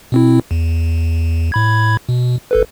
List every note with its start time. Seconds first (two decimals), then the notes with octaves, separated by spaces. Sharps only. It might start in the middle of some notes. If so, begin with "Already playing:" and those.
0.12 B2 C4 E4
0.51 E2
1.52 A2 B5 G#6
2.09 B2
2.51 G1 A4 B4